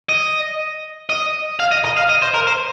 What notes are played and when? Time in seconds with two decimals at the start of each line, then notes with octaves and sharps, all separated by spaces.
0.09 D#5
1.09 D#5
1.60 F5
1.72 D#5
1.85 D#5
1.97 F5
2.09 D#5
2.22 C5
2.34 A#4
2.47 C5